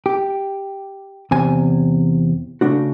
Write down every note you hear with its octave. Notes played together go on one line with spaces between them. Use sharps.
G4
E2 C3 G#5
C#3 A3 D4 F#4